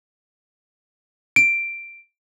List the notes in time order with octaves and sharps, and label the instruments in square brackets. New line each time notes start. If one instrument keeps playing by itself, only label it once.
[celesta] D7